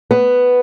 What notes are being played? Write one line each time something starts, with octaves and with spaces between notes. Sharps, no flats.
B3